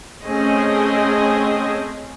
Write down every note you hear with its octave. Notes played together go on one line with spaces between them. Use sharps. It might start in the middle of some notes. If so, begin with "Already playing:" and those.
A3 C4 C#4 G#4 D#5